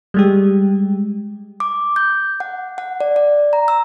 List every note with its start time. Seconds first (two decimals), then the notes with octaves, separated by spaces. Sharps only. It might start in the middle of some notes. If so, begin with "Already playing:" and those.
0.14 G3 G#3 G4
1.60 D6
1.96 G6
2.40 F#5
2.78 F#5
3.01 D5
3.16 D5
3.53 A#5
3.68 E6